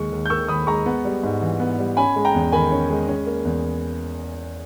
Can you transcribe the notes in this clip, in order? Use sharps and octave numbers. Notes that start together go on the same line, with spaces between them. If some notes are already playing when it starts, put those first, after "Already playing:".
Already playing: D#2 G#3 C#6
D#2
G6
D#3 C#6 E6
D#2 B5 D#6
G#3 A#5 C#6
B3
G3
G#2
E3
B3
G3
C#4 G#5 B5
G#3
G5 A#5
E2
D#3 G#5 B5
C#4
G#3
C#4
A#3
E2